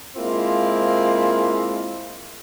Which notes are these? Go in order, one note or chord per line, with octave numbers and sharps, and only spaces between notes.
G#3 A#3 C4 E4 F4